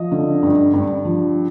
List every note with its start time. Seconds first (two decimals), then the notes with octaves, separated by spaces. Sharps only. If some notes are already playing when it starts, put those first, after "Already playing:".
Already playing: F3 D#5
0.12 D3
0.43 G2
0.74 G2
1.05 F3